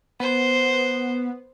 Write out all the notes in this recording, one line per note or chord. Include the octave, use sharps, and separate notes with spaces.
B3 C5